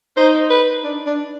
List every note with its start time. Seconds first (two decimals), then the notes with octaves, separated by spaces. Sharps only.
0.16 D#4 C5
0.50 B4
0.84 D4
1.07 D4